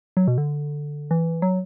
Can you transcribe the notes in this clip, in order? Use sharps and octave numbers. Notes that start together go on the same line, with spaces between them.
F#3
B2
D3
E3
F#3